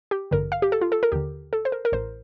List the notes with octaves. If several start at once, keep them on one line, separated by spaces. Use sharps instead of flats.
G4
A1 G2 D3 A#4
F5
G4
A4
F4
A4
A#4
D#2 D3 G4
A4
C5
A#4
A#4
A1 A2 C5